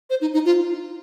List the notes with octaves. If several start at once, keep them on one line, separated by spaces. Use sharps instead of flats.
C5
D#4
D#4
F4